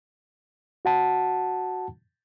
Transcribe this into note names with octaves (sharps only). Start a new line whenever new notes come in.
F#4 F#5 A5